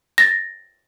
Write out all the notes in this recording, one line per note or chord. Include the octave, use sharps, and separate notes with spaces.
A6 A#6